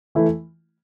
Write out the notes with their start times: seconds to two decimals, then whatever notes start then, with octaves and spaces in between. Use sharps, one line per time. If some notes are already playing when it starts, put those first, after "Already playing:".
0.15 E3 A3 E4